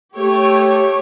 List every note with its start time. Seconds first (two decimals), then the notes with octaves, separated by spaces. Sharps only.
0.15 A3 G4 C#5